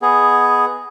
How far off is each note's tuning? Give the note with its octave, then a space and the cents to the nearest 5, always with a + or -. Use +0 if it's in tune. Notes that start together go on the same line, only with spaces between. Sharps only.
B3 +0 G#4 +0 D#5 +0